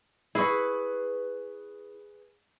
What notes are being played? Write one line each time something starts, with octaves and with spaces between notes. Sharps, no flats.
E4 G#4 B4 C#6